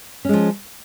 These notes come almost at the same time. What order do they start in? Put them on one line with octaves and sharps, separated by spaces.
C#4 G#3 F3